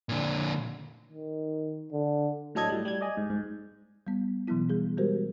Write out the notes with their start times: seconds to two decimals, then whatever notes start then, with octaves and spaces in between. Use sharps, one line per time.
0.09 A#2 D3
1.10 D#3
1.92 D3
2.55 A2 F#3 D4 A4 D#5 G#6
2.69 A2 G3
2.85 G3 G#6
3.01 D5 D#5 G#5
3.17 G#2
3.30 G#2
4.07 G3 B3
4.47 B2 E3 F#3 B3 E4
4.70 G3 G#4
4.98 G3 G#3 F#4 G4 A#4 C5